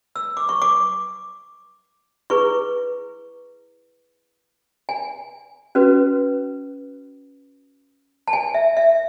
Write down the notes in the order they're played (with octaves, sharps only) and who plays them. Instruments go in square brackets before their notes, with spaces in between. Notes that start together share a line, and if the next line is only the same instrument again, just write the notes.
[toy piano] E6
D6
C#6
D6
E4 G#4 B4 C#6
G#5
C#4 F#4 B4
A5
G#5
E5
E5